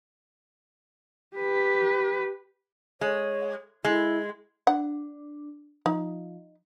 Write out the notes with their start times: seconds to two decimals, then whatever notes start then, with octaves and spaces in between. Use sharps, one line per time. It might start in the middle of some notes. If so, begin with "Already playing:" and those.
1.36 G4 B4
3.01 G#3 C#5
3.85 G#3 E4
4.67 D4 F#5
5.86 F3 D#4